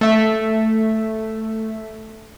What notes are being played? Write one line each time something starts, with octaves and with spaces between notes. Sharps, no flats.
A3 E5